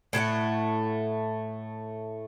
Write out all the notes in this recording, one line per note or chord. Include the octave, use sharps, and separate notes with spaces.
A2 A3 G#4 F#5